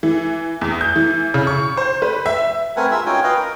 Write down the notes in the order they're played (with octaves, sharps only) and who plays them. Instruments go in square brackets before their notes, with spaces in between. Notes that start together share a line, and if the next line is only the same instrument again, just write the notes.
[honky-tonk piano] E3
E2
G6
E3
C#3
C#6
C5
B4
E5
[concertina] A3 C4 A#4 B4 F#5 G#5
G#3 F4 A#4 E5 E6
C#4 D#4 F4 F#4 G5 G#5
B4 D#5 F5 G5
A#4